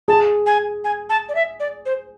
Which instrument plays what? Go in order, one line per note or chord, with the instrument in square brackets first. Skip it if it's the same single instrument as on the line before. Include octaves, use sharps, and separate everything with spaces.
[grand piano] G#4 [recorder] A5
[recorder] G#5
G#5
A5
D5
E5
D5
C5